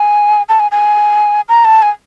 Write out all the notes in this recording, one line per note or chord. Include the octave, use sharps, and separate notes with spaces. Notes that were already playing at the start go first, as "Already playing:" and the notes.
Already playing: G#5
A5
G#5
G#5
A#5
A5
G#5